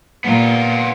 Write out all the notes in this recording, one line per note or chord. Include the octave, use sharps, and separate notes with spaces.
A#2 B3 F4